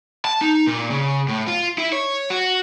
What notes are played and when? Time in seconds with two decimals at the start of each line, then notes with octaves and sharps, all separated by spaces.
0.25 A5
0.41 D#4
0.67 A#2
0.91 C#3
1.28 A2
1.47 F4
1.78 E4
1.92 C#5
2.30 F#4